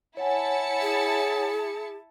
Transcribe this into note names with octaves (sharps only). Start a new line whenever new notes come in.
E4 C#5 F#5 G#5 A5 C#7
G#4